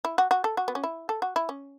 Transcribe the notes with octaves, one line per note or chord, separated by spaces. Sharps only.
E4
F#4
F#4
A4
F#4
B3
C#4
E4
A4
F#4
E4
C#4